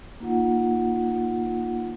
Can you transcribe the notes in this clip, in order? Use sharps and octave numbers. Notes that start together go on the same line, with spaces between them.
A#3 D#4 F4 F#5